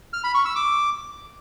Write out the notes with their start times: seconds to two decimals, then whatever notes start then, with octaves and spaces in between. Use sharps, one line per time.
0.13 F6
0.24 B5
0.34 C#6
0.45 E6
0.56 D6